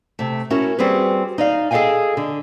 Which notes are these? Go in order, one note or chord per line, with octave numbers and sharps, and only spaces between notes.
C3 A3
C#4 E4 F#4 A#4
G3 C4 F#4 G#4 B4
D#4 D5 F5
G#4 A4 D#5 F5 G5 G#5
D3